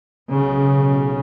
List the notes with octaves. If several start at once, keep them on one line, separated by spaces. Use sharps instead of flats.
B1 C#3